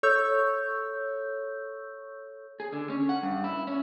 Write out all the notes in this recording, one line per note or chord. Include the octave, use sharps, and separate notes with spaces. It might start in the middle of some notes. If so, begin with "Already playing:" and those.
A4 C#5 C#6 E6 G6
G#4
D3
C#4
F#5
G2
E4
C#4